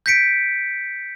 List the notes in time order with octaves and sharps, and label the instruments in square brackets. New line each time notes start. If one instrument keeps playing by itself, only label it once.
[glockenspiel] G6 A#6 B6 C#7 D7